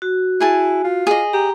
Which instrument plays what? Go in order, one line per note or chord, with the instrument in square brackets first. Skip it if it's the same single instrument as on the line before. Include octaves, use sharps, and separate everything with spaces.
[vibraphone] F#4
[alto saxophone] E4 [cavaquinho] G#4 G#5 A5
[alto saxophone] F4
[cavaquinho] G#4 D#5
[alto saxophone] G4 [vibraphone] A#5